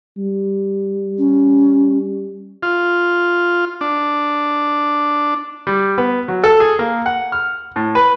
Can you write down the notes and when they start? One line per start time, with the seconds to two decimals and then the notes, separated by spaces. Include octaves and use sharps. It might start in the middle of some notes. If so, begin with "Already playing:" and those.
0.18 G3
1.18 C#4
2.63 F4
3.81 D4
5.67 G3
5.98 B3
6.28 F#3
6.44 A4
6.60 G#4
6.79 A#3
7.06 F#5
7.32 F6
7.76 A2
7.95 B4